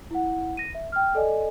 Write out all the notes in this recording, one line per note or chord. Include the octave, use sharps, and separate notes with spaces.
E4 F#5
A#6 D#7
E5
G5 F6
A4 D5 D#5 G#5